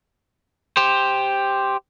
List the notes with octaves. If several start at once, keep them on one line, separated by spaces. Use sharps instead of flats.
G4 C5